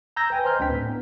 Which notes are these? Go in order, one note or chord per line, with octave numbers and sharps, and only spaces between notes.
A#5 B5 E6 G6 G#6 A#6
B4 G5 G#5
C5 D#5 A#5 C6 F6 G6
D2 C4 D4 B4 G5 B6
A2 D4
B3